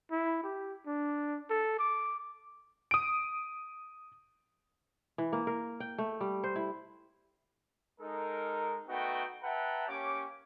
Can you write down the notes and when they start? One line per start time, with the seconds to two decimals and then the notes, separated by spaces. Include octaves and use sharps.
0.11 E4
0.44 G4
0.87 D4
1.50 A4
1.79 D6
2.91 D#6 D7
5.18 E3
5.33 A#3
5.47 A#4
5.80 G5
5.98 A3
6.21 G3
6.43 C5
6.56 E4
8.00 G#3 D#4 A4 A#4
8.88 A3 B3 D#4 F#4 G5
9.43 B4 E5 F#5 G5 A5 A#5
9.88 A#3 C#4 G4 C#5 D6